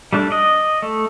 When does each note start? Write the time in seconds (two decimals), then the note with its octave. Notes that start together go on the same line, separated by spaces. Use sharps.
0.13 G3 A3 D4
0.31 D5 D#5
0.82 A3